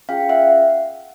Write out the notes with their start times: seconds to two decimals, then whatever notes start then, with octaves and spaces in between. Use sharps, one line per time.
0.09 C#4 F4 G#4 F5 G5
0.29 E5 F#5